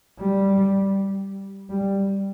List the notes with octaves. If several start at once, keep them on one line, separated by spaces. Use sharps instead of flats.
G3
G3